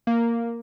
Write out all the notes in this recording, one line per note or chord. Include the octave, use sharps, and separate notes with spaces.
A#3